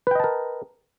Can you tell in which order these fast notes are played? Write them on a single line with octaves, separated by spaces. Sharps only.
B4 G5 D#5 A5 A#4